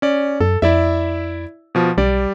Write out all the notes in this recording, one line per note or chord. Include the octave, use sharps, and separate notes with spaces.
C#4 D5
F#2 A4
F2 E4 D5 E5
B2 F3
B1 G3 D5